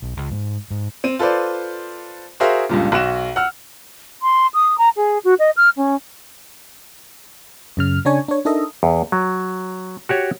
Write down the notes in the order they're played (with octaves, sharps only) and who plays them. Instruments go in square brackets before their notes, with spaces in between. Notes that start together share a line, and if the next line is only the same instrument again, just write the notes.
[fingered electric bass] B1
C#2
G#2
G#2
[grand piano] C4 D#7
F4 A4 B4 C5 D5
F#4 G#4 A#4 C5 E5 F5
C#2 G2 A#2
B1 F#4 F#6 E7
F#5 E6 F6
[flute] C6
D#6
A#5
G#4
F#4
D#5
F6
C#4
[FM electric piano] F#2 C#3 F6
C#3 D4 C#5 G#5
D4 C#5
D4 D#4 A4 A#4 D#5 E5
[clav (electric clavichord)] E2
F#3
F#4 G4 C#5